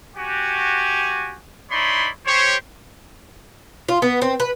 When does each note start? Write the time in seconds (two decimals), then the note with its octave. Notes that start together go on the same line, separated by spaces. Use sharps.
0.16 F#4 G4 G#5
1.71 D#4 E4 C#5 D5 B5 C6
2.26 G4 C5 C#5
3.89 F4
4.02 B3
4.22 C4
4.40 B4